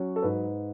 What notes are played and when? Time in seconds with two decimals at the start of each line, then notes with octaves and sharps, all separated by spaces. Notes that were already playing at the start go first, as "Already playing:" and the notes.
Already playing: F#3 C#4 C#5
0.16 A4
0.22 G#2 B4